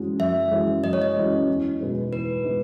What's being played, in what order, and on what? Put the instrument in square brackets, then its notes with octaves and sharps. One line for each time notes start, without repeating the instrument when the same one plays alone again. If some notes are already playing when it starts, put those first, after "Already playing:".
Already playing: [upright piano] F#2 E3 G#3 C#4 F#4
[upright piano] F#2 [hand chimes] E5
[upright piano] E3 G#3 C#4 F#4
[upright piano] F#2 [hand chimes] D#5
[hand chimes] C#5
D#5
[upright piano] E3 G#3 C#4 F#4
E2
B2 G#3 B3 D#4
[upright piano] E2 [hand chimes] B4
[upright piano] B2 G#3 B3 D#4